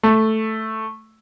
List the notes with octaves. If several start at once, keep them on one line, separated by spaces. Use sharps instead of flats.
A3